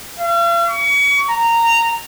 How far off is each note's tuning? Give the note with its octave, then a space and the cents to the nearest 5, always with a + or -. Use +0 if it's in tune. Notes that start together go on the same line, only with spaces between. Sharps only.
F5 -45
C#6 +35
A#5 -15